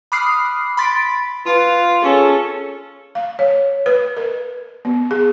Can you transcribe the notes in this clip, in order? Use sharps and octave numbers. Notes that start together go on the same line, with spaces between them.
B5 D6 D#6 F6 F#6 C7
B5 C6 A6 B6 D7
F4 B4 F5
C#4 G#4 A4
F5
C#5
B4
A#4
B3
G#4